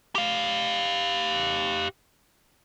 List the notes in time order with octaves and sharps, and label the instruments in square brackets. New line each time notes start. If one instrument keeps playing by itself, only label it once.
[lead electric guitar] G4 F5